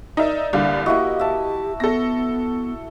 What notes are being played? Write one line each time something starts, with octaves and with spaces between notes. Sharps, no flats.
D#4 A#4 D5 E5
C2 D3 A#3
A#3 E4 F#4 G4 D#5
E5 A5
B3 A4 A#6